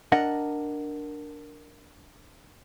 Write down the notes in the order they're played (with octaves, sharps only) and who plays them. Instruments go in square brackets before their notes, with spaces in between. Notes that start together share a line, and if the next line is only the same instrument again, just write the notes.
[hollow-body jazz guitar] D4 A#4 D#5 F#5